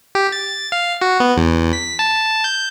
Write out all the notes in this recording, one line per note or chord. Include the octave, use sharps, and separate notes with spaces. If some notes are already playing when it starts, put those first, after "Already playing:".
G4
A6
F5
F#4
B3
E2
B6
A5
G6